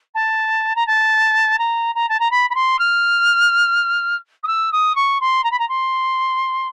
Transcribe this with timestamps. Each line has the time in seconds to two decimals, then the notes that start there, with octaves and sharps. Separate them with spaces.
0.14 A5
0.75 A#5
0.86 A5
1.58 A#5
1.95 A#5
2.09 A5
2.20 A#5
2.31 B5
2.50 B5
2.55 C6
2.79 F6
4.43 D#6
4.47 E6
4.72 D#6
4.95 C#6
5.20 C6
5.44 A#5
5.51 B5
5.59 A#5
5.68 C6